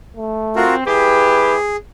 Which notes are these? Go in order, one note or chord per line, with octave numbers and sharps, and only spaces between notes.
A3
C4 F4 F#4 A#4
G3 E4 G4 G#4 B4